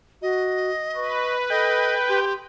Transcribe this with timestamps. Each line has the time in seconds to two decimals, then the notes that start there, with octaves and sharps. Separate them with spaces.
0.22 F#4 D#5
0.95 B4 C#6
1.50 A4 D#5 G5
2.09 G4 C6